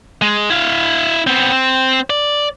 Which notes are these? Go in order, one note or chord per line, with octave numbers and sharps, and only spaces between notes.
G#3
E4 F5
B3 C4
C4
D5